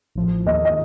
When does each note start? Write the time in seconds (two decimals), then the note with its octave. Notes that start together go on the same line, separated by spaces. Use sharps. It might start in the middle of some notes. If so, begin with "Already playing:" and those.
0.15 A1 A2 F3
0.46 D#2 D#3 A#3 D#5
0.65 D#5